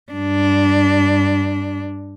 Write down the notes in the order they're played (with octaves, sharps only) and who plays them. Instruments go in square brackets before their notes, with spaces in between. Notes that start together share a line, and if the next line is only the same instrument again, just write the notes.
[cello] G2 D4